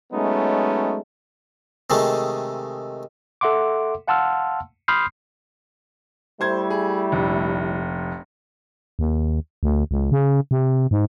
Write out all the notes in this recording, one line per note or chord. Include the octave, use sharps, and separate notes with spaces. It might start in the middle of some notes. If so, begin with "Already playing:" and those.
F#3 G#3 A3 B3 C#4 D#4
C3 D#3 G#3 A3
A4 E5 F#5 C6 D6
F5 F#5 A5 C6 E6 F6
B5 C6 D#6 F6 G6 C7
G3 A3 E4 C5 G#6
G#4
F1 A#1
D#2
D2
C#2
C#3
C3
G#2